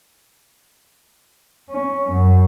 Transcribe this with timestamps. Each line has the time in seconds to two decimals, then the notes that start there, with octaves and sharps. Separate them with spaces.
1.71 C#4
2.11 F#2